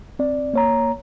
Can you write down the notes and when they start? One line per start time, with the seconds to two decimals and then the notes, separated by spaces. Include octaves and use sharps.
0.19 C4 D5
0.54 A#3 C#5 A#5